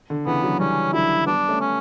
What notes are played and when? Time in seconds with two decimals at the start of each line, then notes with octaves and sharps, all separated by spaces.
0.10 D3
0.26 C#3 E3 B3
0.43 D3 F#3
0.59 E3 G3 C#4
0.93 D3 F#3 E4
1.26 G3 B3 D4
1.49 A3 C#4
1.60 C#4